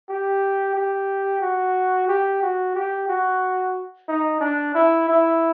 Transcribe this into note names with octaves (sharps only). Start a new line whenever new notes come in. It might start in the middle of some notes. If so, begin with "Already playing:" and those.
G4
G4
F#4
G4
F#4
G4
F#4
D#4
D4
E4
E4